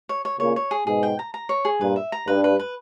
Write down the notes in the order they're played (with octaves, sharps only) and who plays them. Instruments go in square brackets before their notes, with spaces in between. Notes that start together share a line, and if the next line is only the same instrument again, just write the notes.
[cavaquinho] C#5
C#5
[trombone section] A#2 C#3 [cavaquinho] C#5
[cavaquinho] C#5
G#4
[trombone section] G#2 B2 [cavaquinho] G#4
[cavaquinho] G5
A#5
A#5
C#5
G#4
[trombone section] G2 A#2 [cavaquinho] B4
[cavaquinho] E5
A#5
[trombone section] G2 [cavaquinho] B4
[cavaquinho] B4
B4